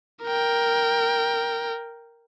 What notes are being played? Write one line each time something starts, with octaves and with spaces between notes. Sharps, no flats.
A#4 G5